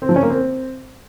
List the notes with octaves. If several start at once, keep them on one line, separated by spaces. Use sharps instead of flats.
C4
F3
C#4
A#3
C4